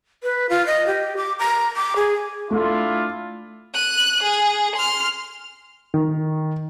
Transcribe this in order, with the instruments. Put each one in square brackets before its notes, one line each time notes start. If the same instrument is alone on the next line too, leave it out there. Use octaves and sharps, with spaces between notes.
[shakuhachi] B4
F4
D#5
G4
D6
A#5
D6
G#4
[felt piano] A3 [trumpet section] D4 E4 F4
[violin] F#6 D#7
G#4
C6 F6
[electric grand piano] D#3